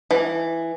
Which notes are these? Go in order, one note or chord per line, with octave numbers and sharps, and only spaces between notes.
E3